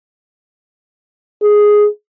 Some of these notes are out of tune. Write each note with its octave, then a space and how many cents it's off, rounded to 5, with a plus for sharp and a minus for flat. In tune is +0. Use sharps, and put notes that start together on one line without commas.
G#4 +5